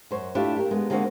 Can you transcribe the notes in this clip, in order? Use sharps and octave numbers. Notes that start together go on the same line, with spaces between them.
F#2 C5 C#5
A3 D4 E4 F4 G4
G4 A#4
G#3 B3
D3 G#3 A#3 C4 F#4